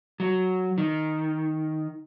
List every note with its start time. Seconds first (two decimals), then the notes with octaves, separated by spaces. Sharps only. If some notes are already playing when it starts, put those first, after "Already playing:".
0.20 F#3
0.78 D#3